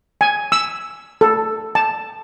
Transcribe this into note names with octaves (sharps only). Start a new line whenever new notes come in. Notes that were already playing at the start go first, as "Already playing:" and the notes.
G#5
E6
A4
A5